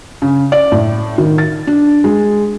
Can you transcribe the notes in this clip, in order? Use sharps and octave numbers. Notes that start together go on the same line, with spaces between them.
C#3
D5
A2
D#3
A6
D4
G#3